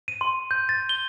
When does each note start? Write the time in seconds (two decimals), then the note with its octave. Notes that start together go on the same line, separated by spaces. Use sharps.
0.08 D#7
0.21 C6
0.51 G6
0.69 A6
0.89 G7